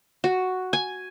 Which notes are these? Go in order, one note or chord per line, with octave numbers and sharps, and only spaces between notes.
F#4
G#5